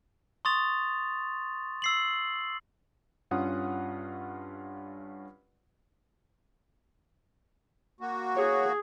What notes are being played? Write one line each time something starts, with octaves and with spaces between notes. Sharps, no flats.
C6 C#6 D#6 A6 F7
E6 C7 F#7
G2 C#4 F4 F#5 D#6
A#3 F#4
G#4 C#5